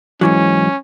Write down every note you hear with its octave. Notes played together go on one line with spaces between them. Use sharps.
G#2 E3 F#3 C#4